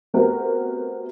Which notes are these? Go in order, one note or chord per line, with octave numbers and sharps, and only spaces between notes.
A3 B3 C4 F#4 G4 A#4